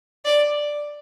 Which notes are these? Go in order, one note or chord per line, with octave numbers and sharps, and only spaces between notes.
D5